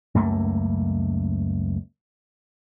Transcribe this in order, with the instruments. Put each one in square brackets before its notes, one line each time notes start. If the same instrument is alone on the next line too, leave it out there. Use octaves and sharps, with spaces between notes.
[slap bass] C#2 F#2 A3 A#3